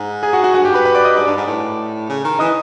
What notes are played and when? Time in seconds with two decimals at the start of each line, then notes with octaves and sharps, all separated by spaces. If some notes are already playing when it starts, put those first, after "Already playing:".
Already playing: G#2
0.23 G#4 G#5
0.33 F#4 F#5
0.44 F#4 F#5
0.54 G2 F#4 F#5
0.65 G4 G5
0.74 B4 B5
0.85 B4 B5
0.95 D5 D6
1.05 D#5 D#6
1.16 G#2 D5 D6
1.26 G2
1.37 G#2
1.47 A2
2.09 C#3
2.24 D#3
2.39 E3 D#5 D#6